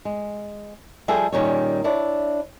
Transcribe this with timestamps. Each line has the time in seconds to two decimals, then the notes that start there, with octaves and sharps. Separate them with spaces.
0.05 G#3
1.08 F3 G3 G#4 A4 E5 G5
1.32 A#2 D#3 G3 C#4 G#4 C#5
1.84 D4 E4 C#5 D5